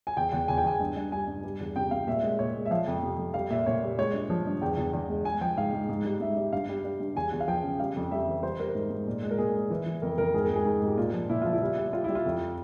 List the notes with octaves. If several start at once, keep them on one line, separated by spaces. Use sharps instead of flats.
G#5
E2 G5
E2 G5
E2 G#5
G5
E2 G#5
G2
G2
G3 G#5
G2
G3
E2
C3 G5
C3 F5
A#2 E5
G#3
A#2 C#5
G#3
E5
F3 F5
F2
C3
F2
G3 F5
A#2 E5
A#2 C#5
G3
G#3 C#5
G2
F3
G2
E2 G5
E2
E2
G#3
G#3 G#5
F3 G5
G#2 F5
G#2
G#2
G3
G#2 E5
G3
G2 F5
G3
G3
G2
E2 G#5
E2
F5
F3 G5
C#3
G3 F5
F2
G3 E5
E3
G3 C5
G3 A#4
G#2
G#2
A#2
G#3
A#4
A#2 G#4
G#3
E3
E3
F2 A#4
F2 A#4
G#2 G#4
A#4
G#2
G#4
G#2
G#2
G4
A#2 F4
F3
A#2 E4
F3 F4
E4
G3
G3
G3 F4
G3 E4
F4
F2